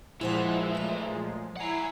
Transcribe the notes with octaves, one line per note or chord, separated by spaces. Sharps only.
A#2 E3 F3 G#3 E4 C5 F#5
F#3 A3
E4 F#5 G#5 A#5 C7